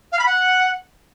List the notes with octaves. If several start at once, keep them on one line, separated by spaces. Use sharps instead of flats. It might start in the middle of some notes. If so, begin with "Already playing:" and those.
F5
B5
F#5